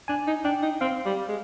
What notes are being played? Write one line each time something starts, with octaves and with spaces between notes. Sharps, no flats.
D4 G#5
D#4
D4 G5
D#4
C4 F5
G3
G#3